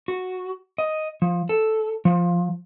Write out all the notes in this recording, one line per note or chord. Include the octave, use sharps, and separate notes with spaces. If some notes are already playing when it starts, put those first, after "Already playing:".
F#4
D#5
F3
A4
F3